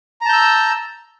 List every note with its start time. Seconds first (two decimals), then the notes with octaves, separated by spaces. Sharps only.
0.21 A#5
0.25 A5
0.29 G6
0.33 E6